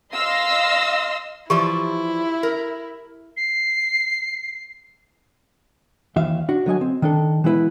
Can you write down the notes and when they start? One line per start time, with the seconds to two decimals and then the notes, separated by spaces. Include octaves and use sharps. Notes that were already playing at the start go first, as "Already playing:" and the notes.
0.14 D#5 F5 C6 E6 A#6
1.50 E3 F3 E4 G4 D5 C#6
2.43 A#4
3.37 C7
6.16 D#2 E3 E5 F5
6.49 D4 F#4
6.66 D3 F#3 D#5 G#5
6.81 C4
7.02 D#3 D4 A4
7.44 E3 G#3 B3 E4 B4